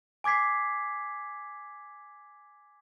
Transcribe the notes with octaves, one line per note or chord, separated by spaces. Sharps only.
G#5 D6 G#6 B6 C7